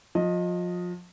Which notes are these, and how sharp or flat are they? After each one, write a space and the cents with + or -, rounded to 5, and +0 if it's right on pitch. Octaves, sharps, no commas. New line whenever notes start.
F3 +30 D#5 +0